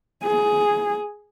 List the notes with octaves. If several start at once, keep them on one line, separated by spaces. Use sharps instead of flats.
G#4